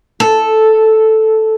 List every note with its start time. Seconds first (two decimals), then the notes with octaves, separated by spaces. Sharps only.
0.20 A4